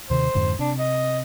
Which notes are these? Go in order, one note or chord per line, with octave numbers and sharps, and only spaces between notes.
D#2 C3 D#3 C5
F2 G#2 D3
C3 D4
D#5